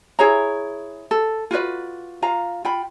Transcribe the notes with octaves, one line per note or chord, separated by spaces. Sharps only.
E4 G#4 C#5 A#5
A4
F4 F#4 B4 D5
F4 F5 A#5
F4 G5 B5